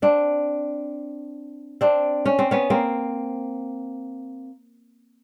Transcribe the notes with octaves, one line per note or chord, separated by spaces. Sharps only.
C4 D4
C4 D4
C#4
C4
B3 C#4
A#3 C4